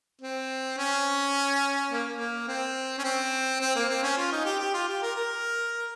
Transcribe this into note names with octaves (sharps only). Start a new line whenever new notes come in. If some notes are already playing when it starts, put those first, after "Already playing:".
C4
C#4
A#3
A#3
C4
C#4
C4
C4
A#3
C4
C#4
F4
D#4
G4
G4
F4
G4
A#4
A#4